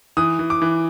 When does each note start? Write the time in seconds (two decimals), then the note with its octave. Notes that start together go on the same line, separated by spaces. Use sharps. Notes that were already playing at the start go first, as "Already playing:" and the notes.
0.17 E3 D#6
0.39 E3
0.50 D6
0.62 E3